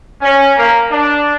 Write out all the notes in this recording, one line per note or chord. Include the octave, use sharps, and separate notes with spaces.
C#4
A#3
D4